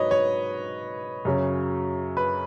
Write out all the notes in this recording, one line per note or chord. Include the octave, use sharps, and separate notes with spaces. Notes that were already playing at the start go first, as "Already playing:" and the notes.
Already playing: G#2 F#3 B4 C#5 D#5
C#5
F#2 C#3 F#3
B4